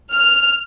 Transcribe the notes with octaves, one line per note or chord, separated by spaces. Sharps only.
F6